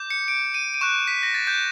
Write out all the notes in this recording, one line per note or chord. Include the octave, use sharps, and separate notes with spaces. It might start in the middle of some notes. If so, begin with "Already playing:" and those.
Already playing: D6 G6
C#7
D7
D#7
D#7
C#6 F#6 E7
B6
A#6
A6
G6